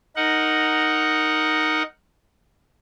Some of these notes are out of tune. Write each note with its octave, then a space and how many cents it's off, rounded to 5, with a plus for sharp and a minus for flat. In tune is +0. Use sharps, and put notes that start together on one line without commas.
D#4 +0 A#4 +0 F#5 +0